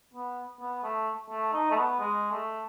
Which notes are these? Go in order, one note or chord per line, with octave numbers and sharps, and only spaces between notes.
B3
B3
A3
A3
D#4
A3
B3
G#3
A3